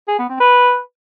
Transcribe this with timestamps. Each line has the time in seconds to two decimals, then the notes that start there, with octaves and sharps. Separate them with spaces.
0.08 G#4
0.19 B3
0.30 C4
0.40 B4